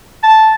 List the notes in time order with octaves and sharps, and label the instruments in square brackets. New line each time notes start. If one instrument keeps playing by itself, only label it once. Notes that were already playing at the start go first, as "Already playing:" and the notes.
[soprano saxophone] A5